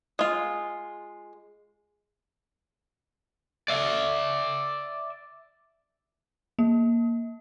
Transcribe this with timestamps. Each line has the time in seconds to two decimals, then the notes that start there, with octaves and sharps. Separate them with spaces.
0.19 G#3 F4
3.68 D5 E5
6.59 A#3